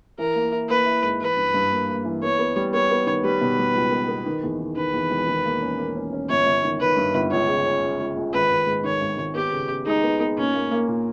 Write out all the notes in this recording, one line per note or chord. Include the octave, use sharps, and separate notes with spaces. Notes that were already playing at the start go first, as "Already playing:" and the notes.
E3 A#4
A#3
E4
A#3 B4
E4
G#2
E3 B4
G2
G2
A#3
A#3
E3
B3 C#5
B3
G3
B3 C#5
B3
D#3
G3 B4
B2
G3
C#2
B3
B3
D#3
E2
D#3
D#3 B4
E2
E1
D#3
A#3
C#4
A#3
C#4
C#4
G1 C#5
G1
D#3
D#3 B4
G2
G1
C#2 C#5
C#3
C#4
C#2
C#2
C#2
G#1 B4
G#1
G#2
D#3 C#5
G#1
G#1
B3 G4
C#3
C#3
G#3 D#4
B3
B3
A#2 C#4
A#3
A#3
A#2